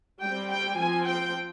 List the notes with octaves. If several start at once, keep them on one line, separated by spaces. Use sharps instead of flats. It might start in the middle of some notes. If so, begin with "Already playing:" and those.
G3 C4 G5
G5
F3 C4 G#5
G5